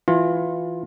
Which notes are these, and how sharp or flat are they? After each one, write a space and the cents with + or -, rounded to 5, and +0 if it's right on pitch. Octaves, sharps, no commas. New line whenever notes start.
E3 +15 F4 +20